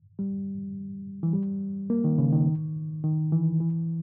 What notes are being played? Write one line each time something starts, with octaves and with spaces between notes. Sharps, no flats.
G3
E3
G3
A#3
D#3
C#3
D#3
D#3
E3
E3